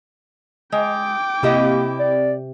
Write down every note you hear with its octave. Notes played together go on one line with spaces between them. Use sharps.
G#3 G5 D6
C3 A#3 E4 G4 D#5
D5